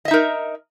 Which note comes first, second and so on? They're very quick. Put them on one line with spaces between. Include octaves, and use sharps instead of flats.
D#5 E5 D#4 A#4